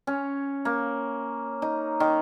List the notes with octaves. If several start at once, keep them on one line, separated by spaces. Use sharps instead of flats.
C#4
A#3
D#4
D#3